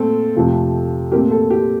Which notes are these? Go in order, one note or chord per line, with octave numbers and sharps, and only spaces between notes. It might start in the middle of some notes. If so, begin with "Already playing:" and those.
Already playing: A#2 A3 C4 A4
F2 C3 F3 A3
A#2 A3 C4 G4 A#4
A4
G4